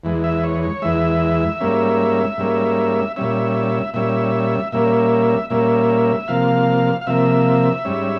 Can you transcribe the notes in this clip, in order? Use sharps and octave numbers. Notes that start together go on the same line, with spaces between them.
E2 E3 G#3
E5
C#5
C#5
E2 E3 G#3 E5
G#2 G3 A#3 C#4
G#2 G3 A#3 C#4
A#2 G3 C#4 E5
A#2 G3 C#4 E5
A#2 G3 A#3 C#4 E5
A#2 G3 A#3 C#4 E5
C3 F3 A#3 F5
F5
C3 F3 A#3 E5
G#2 G3 C#4